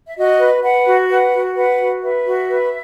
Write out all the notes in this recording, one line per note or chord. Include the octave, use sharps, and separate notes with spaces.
E5
F#4 D#5
B4
B4 F#5
F#4
B4 F#5
F#4
B4 F#5
F#4
B4 E5
F#4
B4